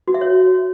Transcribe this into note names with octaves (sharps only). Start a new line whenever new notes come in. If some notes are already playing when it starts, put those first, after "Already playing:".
F#4
E5
C#5